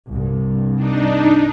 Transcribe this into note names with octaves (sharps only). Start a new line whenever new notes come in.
C2 G2
D4 D#4